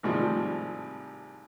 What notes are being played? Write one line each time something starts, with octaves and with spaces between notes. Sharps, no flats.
G#1 A2 C3 F3 G3